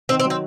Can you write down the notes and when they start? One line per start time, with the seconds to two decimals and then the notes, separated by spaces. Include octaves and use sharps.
0.09 D#3 C4
0.19 C4
0.25 F#3
0.30 C4